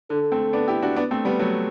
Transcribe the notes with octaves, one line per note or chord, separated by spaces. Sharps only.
D3 A4
A3 C4
B3 D4
E4 G4
D4 F#4
B3 D4
A3 C4
G3 B3
F#3 A3